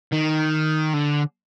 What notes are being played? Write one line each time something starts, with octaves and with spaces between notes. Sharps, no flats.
D#3
D3